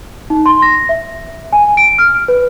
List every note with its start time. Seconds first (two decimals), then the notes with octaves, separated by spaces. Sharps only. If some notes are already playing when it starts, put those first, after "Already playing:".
0.30 D#4
0.46 C6
0.62 A#6
0.89 E5
1.53 G#5
1.77 D7
1.98 F6
2.28 B4